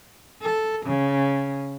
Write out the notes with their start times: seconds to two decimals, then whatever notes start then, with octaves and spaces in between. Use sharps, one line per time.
0.42 A4
0.85 C#3